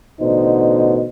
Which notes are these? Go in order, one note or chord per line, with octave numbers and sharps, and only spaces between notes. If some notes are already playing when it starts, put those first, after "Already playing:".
A1 B2 D3 D#4 C5